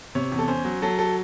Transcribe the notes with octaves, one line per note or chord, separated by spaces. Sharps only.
C3 C#5
E2
A4
C#4 C5
F#3
F#3 A4
A4